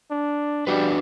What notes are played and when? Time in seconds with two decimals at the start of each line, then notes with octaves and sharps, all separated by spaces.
0.11 D4
0.67 G3 D4 F#4 B4